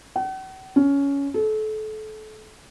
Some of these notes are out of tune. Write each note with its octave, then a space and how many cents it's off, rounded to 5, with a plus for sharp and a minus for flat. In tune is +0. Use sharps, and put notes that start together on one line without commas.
F#5 +45
C#4 +15
A4 -30